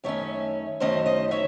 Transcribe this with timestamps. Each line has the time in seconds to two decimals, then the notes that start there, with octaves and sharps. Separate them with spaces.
0.04 F#2 D#3 A3 C#4 C#5 E5
0.80 F#2 D#3 A3 C#4 C5 D#5
1.06 C5 D#5
1.31 C#5 E5